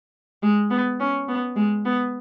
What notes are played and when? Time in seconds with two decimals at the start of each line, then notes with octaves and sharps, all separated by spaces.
0.43 G#3
0.70 B3
1.00 C#4
1.28 B3
1.56 G#3
1.85 B3